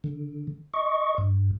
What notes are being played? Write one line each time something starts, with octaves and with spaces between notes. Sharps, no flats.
D3
D#5 C#6
G2